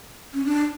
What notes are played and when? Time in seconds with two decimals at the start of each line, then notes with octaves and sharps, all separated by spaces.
0.34 C#4
0.45 D4